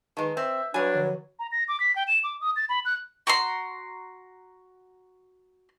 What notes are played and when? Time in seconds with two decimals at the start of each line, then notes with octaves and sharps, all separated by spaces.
0.17 D#3 G#3 B4 D#5 A5
0.37 C4 E5
0.74 G2 F#3 D4 B4 G#5 B5
0.94 D3 F3 C#5
1.39 A#5
1.52 A#6
1.68 D6
1.80 B6
1.96 G5
2.07 E7
2.24 D6
2.41 D#6
2.56 A6
2.69 B5
2.85 F#6
3.27 F#4 A#5 C6